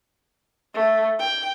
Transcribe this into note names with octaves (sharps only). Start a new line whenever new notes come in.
A3
G5